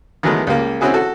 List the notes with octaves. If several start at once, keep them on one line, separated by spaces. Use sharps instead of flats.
D#3 E3 F#3 G#3 A3 B3
C#2 G3 A#3
C4 C#4 E4 F#4 G#4
F#4 A4